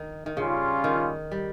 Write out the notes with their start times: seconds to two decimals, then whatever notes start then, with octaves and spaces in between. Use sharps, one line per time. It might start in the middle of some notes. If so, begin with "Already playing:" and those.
Already playing: D#3
0.26 D#3
0.37 C#3 G3 C#4 F4
0.84 D#3
1.32 G3